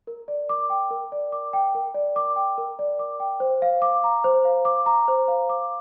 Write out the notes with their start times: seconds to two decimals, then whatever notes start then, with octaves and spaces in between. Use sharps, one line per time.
0.07 A#4
0.28 D5
0.49 D6
0.70 G5
0.91 A#4
1.12 D5
1.32 D6
1.53 G5
1.75 A#4
1.94 D5
2.16 D6
2.36 G5
2.58 A#4
2.79 D5
2.99 D6
3.20 G5
3.40 C5
3.62 F5
3.82 D6
4.04 A#5
4.24 C5
4.45 F5
4.65 D6
4.86 A#5
5.08 C5
5.28 F5
5.49 D6